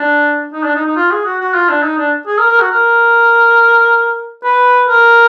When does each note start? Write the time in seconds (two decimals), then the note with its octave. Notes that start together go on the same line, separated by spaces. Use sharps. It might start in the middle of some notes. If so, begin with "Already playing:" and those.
Already playing: D4
0.53 D#4
0.64 D4
0.75 D#4
0.86 D#4
0.96 F4
1.11 G#4
1.26 F#4
1.40 F#4
1.55 F4
1.69 D4
1.83 D#4
1.98 D4
2.27 G#4
2.38 A#4
2.49 A#4
2.60 F#4
2.71 A#4
4.44 B4
4.88 A#4